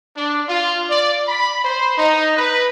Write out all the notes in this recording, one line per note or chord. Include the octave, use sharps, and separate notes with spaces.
D4
F4
D5
B5
C5
D#4
B4